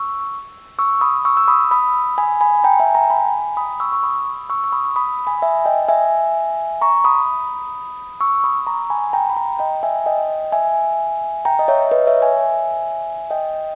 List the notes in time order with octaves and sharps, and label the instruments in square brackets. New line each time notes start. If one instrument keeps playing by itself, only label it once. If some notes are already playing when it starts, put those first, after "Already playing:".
Already playing: [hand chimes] C#6 E6
C#6 E6
B5 D#6
C#6 E6
E6
B5 D#6
B5 D#6
G#5 B5
G#5 B5
G5 A#5
E5 G#5
G5 A#5
G#5 B5
B5 D#6
C#6 E6
C#6
B5 D#6
C#6 E6
C#6
B5 D#6
B5 D#6
G#5 B5
E5 G#5
D#5 G5
E5 G#5
A#5 C#6
B5 D#6
C#6 E6
B5 D#6
A#5 C#6
G#5 B5
G5 A#5
B5
G5 A#5
D#5 G5
E5 G#5
D#5 G5
E5 G#5
G5 A#5
D#5
C#5 E5
B4 D#5
C#5 E5
E5 G#5
D#5 G5